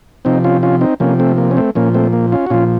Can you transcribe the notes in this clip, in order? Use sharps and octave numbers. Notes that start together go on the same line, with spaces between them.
C3 F3 C4 D#4
C#4 F4
C#4 F4
C4 D#4
C3 F3 A#3 C#4
A3 C4
A#3
C#4
A3 C4
A#2 F3 A#3 C#4
A3 C4
A#3
C#4 F4
F#4
A#2 F3 C#4 F4